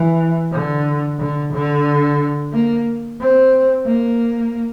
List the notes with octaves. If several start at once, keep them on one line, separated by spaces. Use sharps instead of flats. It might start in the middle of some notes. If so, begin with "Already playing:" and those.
Already playing: E3
D3
D3
D3
A#3
C4
A#3